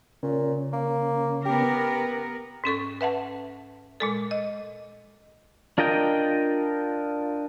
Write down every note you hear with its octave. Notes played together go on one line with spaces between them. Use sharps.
A#2 C#3 C#4
A#3
B3 G4 A#4
G#2 C#4 A4 C#6
B4 E5 F#5 A5
A#2 G#3 A4
D#5
D4 F4 A#4 D#5 G5